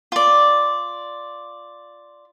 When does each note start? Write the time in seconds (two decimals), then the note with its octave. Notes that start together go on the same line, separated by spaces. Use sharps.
0.12 F4 D5